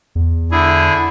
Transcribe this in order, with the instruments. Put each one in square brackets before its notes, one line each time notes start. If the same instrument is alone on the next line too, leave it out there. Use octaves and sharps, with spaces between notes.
[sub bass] E2
[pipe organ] D3 G#4 [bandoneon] E4